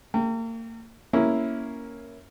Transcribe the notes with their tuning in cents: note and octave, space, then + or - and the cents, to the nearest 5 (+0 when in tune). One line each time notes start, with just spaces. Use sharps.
A#3 -40 G5 +0
A#3 +0 C#4 +0 E4 +0